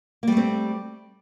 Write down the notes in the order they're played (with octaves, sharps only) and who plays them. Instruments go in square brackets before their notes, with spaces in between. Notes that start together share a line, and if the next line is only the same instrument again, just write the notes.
[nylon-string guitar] A#3
G3
A3
C4